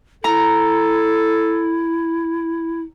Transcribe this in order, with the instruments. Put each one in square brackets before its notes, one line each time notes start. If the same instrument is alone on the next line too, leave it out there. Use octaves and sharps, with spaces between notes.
[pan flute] E4 [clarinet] A4 [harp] A#5